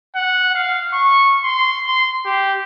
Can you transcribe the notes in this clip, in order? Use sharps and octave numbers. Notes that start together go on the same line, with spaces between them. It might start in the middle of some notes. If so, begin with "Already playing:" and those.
F#5
F5
C#6
C6
C6
G4